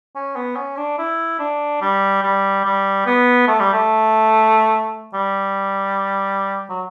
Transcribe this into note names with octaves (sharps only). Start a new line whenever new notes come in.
C#4
B3
C#4
D4
E4
D4
G3
G3
G3
B3
A3
G3
A3
G3
F#3